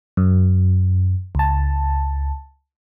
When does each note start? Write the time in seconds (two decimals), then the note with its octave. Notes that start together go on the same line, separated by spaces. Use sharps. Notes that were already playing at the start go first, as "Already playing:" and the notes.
0.17 F#2
1.35 C#2 A5